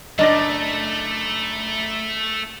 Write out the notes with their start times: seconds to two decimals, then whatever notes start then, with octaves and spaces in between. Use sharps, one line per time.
0.19 F#1 A3 D4 D#5 A#6